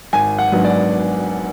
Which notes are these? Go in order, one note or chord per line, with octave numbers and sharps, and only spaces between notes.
G#1 G#5
F#5
G#2 F#3 B3 D4
D5